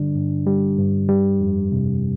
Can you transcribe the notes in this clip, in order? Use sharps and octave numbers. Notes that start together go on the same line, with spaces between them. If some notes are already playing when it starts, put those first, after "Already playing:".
Already playing: G2 D3 G3 D4
G2
G3
G2
G3
F2
C3